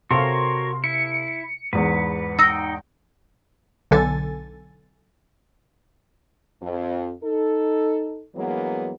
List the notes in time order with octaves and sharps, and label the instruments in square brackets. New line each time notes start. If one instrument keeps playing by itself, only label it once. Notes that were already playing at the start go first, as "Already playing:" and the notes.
[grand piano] C3 A4 F5 [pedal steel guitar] F#4 A#4 C#5 [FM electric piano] C6
[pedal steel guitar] E4 [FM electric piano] C#7
[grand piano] E2 G#2 [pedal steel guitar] B4
[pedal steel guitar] D#4 G5 [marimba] E6 A#6
[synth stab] B1 D3 A4 G#5 A6
[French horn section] F2
D#4 A4
G2 E3 F#3 G#3 A#3 B3